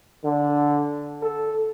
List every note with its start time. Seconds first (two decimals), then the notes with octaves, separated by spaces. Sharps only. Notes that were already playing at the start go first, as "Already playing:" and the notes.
0.25 D3
1.23 A4